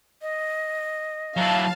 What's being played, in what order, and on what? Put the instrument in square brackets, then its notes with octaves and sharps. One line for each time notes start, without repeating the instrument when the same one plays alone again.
[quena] D#5
[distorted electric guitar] F#3 E4 [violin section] F5 A5